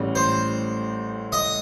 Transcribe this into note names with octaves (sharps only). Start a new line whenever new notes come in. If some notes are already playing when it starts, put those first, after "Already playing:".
Already playing: A1 A2 G3
C5
D#5